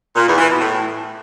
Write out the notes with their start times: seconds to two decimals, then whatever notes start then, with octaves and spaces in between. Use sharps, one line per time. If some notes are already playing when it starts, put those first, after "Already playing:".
0.15 A#2
0.27 E2
0.38 E3
0.49 B2
0.61 A2